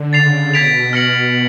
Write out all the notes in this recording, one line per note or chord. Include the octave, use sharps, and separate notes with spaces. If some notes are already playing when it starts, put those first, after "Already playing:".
Already playing: D3
C#3 A6 C7 F7
B2 G#6 B6 D7 F7
F6 A#6 C#7 F#7